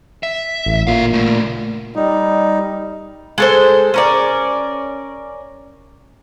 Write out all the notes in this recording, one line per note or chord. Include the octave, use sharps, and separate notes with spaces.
E5
A1
A#2 D3 F5
C#3 A3
G3 D#4
G#3 A4 C5
C#4 A#4 D5